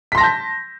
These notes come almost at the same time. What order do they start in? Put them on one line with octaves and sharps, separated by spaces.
B6 C6 A#6 A5 G6